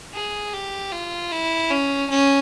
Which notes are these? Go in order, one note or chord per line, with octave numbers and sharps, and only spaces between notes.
G#4
G4
F4
E4
C#4
C#4